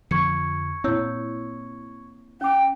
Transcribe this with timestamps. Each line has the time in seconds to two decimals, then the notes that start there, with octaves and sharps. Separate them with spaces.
0.11 F2 D3 F3 C#6 G#6 C#7
0.84 A#2 C4 E4 C#5 E6
2.41 C#4 G5 D6